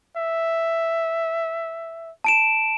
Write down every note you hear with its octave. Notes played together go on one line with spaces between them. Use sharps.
E5
A5 D7 E7